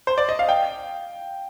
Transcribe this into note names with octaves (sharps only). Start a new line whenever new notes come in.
C5
D5
D#5
F5
G5